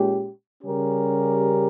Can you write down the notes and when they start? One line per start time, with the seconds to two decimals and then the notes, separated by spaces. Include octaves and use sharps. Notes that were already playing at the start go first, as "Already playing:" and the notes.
Already playing: A#2 G#3 C#4 G4
0.64 C#3 G3 C#4 G4 A#4